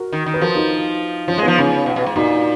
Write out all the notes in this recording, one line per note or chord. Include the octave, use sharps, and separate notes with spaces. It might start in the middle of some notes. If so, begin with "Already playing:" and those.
Already playing: F#4 A#4
D#3
D#3
B4
F3 F#4 A#4
D#4 F#4
F3 C#4 F4
G#3
F3 B3 D#4
C#3 C#4 F4
B2
B2
G#2
A#2 D#4 F#4